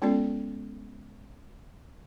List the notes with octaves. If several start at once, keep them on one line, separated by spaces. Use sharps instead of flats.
G#3 B3 C#4 F4 A4 D5